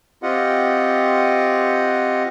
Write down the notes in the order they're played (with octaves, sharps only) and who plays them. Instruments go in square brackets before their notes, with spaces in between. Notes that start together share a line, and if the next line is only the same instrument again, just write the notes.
[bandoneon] C4 F4 G4 D#5 F#5